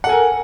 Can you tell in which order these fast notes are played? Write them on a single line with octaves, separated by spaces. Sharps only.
F#5 A4 G#5 A#4